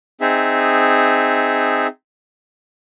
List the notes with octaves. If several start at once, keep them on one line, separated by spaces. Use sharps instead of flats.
C4 D#4 G#4 E5